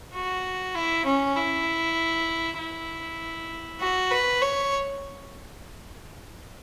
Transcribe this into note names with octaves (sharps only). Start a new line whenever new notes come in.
F#4
E4
C#4
E4
E4
F#4
B4
C#5